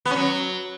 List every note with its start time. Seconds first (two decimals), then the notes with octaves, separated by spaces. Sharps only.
0.05 B3
0.11 C#4
0.16 F#3